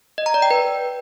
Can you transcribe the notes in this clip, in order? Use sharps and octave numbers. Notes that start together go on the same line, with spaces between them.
D#5
A#5
D5
G5
B4